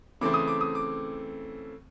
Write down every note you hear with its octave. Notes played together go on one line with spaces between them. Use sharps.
C#3 E3 A3 C4 D6
D#6
D6
D#6
D6